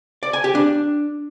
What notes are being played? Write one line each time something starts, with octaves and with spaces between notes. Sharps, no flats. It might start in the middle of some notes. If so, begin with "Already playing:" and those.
D5
G#5
G4
D4